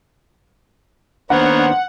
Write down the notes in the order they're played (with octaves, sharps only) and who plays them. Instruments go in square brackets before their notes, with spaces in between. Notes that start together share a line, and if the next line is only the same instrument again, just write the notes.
[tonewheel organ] D#3 A#3 D4 [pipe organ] B3 A#4 C#5 [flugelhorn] C5 [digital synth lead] F#5